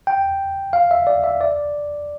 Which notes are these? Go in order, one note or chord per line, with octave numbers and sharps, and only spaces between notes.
G5
F5
E5
D5
E5
D5